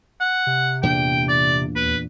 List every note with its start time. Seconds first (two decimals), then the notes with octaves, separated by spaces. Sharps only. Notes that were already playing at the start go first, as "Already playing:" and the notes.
0.21 F#5
0.47 C3
0.83 E2 A#2 D4 G5
1.29 D5
1.76 D#2 B4